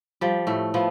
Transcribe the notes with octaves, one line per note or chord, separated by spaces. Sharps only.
F3 G3
A2 A3
F3 B3